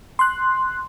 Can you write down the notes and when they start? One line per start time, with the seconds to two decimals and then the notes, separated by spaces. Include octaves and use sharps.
0.19 C6 F#6